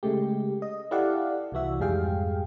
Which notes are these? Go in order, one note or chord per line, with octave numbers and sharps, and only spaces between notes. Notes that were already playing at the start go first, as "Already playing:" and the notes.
C#3 G#3 A3 G4
D#5
E4 G4 A4 D5 F5 F#5
C2 E3 F#4 E5
F2 G#2 G3 G#4 F5 G5